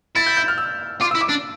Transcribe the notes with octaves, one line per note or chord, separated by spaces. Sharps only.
E4 A6
G6
G6
F6
E6
F4 D6
E4 E6
D6
D4